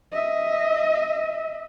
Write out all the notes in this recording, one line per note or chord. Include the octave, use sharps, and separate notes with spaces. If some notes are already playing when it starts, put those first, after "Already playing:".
D#5 E5